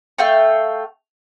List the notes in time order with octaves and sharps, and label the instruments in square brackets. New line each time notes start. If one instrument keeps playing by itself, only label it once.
[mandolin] A3 F5 G5 C#6